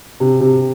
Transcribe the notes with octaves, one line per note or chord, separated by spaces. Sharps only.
C3
C3